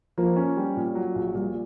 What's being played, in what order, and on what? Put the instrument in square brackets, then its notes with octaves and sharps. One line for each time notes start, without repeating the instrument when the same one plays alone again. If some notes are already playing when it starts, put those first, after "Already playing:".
[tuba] F3 [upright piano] A#3
[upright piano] C#4
G3
A#2
F#3
A#1
[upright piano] A#2 [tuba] G3